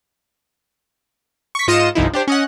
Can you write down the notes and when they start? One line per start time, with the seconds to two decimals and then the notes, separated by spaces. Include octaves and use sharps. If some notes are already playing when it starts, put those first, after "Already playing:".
1.55 C#6 B6
1.67 G#2 F4 D#5 D#6 C#7 E7
1.95 G1 C2 F3 D#4 E4
2.13 D4 G4 C5
2.28 C#4 D#5 F#5